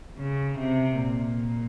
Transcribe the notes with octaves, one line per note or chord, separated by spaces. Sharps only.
C#3
C3
A#2